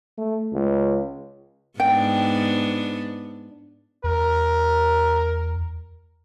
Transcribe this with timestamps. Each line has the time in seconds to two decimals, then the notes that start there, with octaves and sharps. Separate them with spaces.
0.18 A3
0.53 C#2
1.80 G#2 B3 D4 G5
4.04 E2 A#4